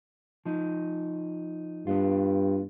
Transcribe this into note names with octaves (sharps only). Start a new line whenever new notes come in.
F3 D#4
G2 B3 D4 F4